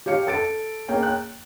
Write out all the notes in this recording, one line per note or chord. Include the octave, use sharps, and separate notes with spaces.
G4 C#5 F5 C#7
A4 A6 D7
A#3 G#4 C#5 G5
F#6